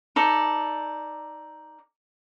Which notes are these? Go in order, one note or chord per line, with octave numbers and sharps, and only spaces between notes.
D#4 A4 D5